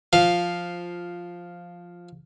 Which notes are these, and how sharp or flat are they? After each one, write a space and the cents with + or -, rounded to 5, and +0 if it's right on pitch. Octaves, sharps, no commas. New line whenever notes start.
F3 +0 F5 +0